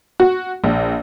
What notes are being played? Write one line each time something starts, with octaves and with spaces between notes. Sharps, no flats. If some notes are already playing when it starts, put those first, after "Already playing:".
F#4
A#1